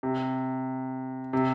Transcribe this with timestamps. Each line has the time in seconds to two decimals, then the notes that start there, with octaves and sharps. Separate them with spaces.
0.03 C3
1.33 C3